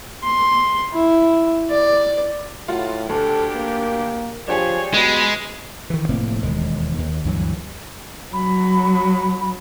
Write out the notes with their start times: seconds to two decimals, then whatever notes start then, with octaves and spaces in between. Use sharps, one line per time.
0.24 C6
0.93 E4
1.70 D5
2.68 A2 F4 F#4
3.09 D2 D4 G4 A4
3.55 A#3
4.48 F3 D4 G4 G#4 C#5
4.94 B2 G#3 B5
5.90 D#3 E3
6.09 F1 A2 A#3 C4
6.41 E1 D#2 G#3
6.98 D#2
7.25 D2 G2 E3 F#3
8.33 F#3 B5